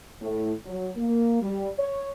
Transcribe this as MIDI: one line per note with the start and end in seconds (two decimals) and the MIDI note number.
0.22 0.52 45
0.66 0.89 54
0.96 1.40 58
1.42 1.70 55
1.78 2.12 73